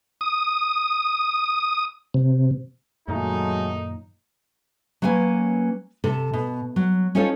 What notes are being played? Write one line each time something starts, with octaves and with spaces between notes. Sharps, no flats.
D#6
C3
F#2 A#2 D#3 F#3 G#3 A3 D#4
F#3 A#3 C#4 B4 G#5
C3 A4
B2
F#3
C#4 D#4 F4 A4 C5 C#5